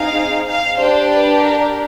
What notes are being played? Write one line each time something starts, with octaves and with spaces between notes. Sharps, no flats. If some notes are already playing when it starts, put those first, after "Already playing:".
Already playing: C4 D#4 G#4 F5
F5
D4 G4 C5
B4
A#4